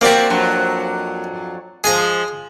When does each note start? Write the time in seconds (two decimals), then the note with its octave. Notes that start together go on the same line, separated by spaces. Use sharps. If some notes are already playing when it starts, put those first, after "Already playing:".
0.01 A#3 C4 F#4 G4 D5
0.30 F2 F#3 D4
1.84 F3 G#3 G#4 G#5 A#5